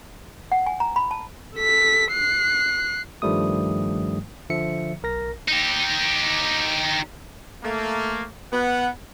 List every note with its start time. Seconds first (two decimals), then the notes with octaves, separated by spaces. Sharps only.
0.52 F#5
0.66 G#5
0.80 A#5
0.96 B5
1.11 A5
1.55 A4 B6
2.12 F#6 C7
3.22 G2 D#3 F3 G3 A3 D#6
4.50 D3 F3 E5 C#7
5.03 B1 A#4 A#6
5.48 D#4 G4
7.63 A3 A#3
8.52 B3 F#5